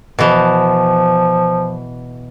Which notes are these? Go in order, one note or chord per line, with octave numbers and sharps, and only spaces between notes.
B2 E3 F3